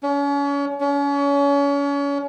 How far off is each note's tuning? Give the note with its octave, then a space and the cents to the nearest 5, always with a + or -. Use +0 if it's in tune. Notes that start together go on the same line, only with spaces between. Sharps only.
C#4 +35
C#4 +35